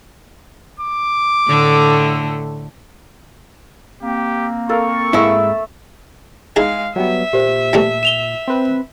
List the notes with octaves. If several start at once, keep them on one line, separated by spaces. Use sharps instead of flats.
D6
A2 D3 A3
A#3 C4 G4
A4 A#4 F5 C#6
G#2 A3 E4 E5
G#3 D#4 E4 G#4 F5
F#3 G3 B3 E5
A#2 G4 C5
E3 G3 A3
E7 F7 G7
C4 B4